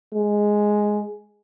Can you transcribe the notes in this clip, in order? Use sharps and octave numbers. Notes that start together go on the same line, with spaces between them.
G#3